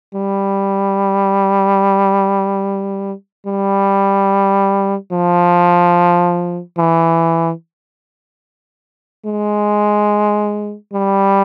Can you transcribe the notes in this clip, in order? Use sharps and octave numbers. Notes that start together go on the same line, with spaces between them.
G3
G3
F3
E3
G#3
G3